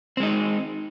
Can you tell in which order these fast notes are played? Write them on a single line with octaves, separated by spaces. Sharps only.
C4 G#3 D#4